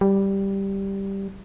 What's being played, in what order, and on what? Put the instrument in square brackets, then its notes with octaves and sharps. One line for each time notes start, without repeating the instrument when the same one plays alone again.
[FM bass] G3